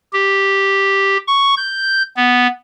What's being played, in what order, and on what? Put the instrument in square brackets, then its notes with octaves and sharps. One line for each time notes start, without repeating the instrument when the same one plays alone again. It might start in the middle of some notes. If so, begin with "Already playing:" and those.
[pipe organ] G4
C#6
G6
B3